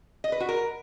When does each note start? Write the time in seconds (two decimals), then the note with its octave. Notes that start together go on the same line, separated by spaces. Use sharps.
0.24 D#5
0.32 B4
0.40 F#4
0.49 A#4